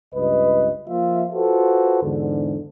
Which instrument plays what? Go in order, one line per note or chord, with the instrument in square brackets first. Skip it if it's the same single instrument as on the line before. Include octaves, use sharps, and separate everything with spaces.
[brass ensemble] C#2 G2 B4 D#5
F3 A#3 F4 E5
F4 F#4 A4 B4 C5
E2 G#2 D3